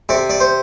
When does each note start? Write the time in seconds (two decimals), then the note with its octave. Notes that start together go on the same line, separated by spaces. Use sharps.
0.09 C3 D5
0.29 D5
0.40 C5